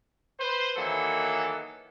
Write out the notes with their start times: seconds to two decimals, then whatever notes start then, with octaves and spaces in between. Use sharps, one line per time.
0.39 B4 C5
0.76 D#3 E3 F#3 A#3 B3 A4